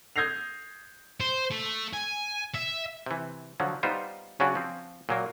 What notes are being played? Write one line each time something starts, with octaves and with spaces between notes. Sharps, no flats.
D#6 G6 G#6 A#6 C7 F7
C5
A3
G#5
E5
C3 E3
D3 F3 F#3
G3 B3 D#4 F4 C5
C#3 F#3 C#4 D4 F#4
F3 C4
A#2 F#3 A#3